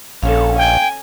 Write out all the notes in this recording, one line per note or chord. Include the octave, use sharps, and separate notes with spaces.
A#1 C#4 A4 F5
G5 G#5